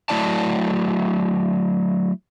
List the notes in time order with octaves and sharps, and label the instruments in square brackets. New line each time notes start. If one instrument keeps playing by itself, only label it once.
[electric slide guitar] F#3 A3 E4 D5 A5